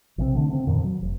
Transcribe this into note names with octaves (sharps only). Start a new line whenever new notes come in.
A#1 C3 E3 C4
D3 A3 D4
C#3 B3 C4
F2 A#2 D#3
F#3
F1